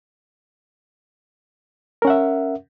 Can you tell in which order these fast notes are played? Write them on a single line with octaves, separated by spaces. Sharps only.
A#4 C#4 F#5 E5